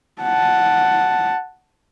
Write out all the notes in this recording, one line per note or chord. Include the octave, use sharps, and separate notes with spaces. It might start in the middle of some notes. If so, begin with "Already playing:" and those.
F#5 A5